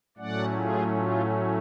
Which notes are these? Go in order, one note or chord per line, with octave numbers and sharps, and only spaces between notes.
A2 F#3 A3 C#4 D5 F#5
F4 G#4
F4